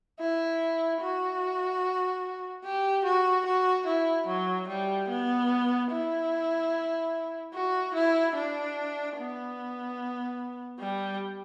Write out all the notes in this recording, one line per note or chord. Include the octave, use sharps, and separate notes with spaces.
E4
F#4
G4
F#4
F#4
E4
F#3
G3
B3
E4
F#4
E4
D4
B3
G3